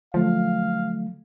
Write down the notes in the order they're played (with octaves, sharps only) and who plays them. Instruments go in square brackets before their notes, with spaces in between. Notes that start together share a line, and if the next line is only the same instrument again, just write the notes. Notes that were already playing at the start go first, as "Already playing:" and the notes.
[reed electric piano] D3 F#3 A3 [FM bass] F3 [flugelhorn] F5